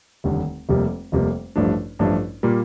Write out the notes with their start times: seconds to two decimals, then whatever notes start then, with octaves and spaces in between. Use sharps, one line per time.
0.24 F1 D#2 D3 G3
0.69 F1 F2 C3 G3 A#3
1.12 F1 F2 C3 G3 A#3
1.56 A1 G2 F3 A3 D4
1.99 A1 G2 F3 A3 D4
2.43 A#2 G3 A#3